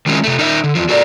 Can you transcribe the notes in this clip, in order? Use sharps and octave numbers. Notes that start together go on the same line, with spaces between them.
D#3 G#3 C#4 G#4 A#4
C3 A3
D#4 A#4 D#5 E5
D3
E2 F3
F#4 A4 A#4 D5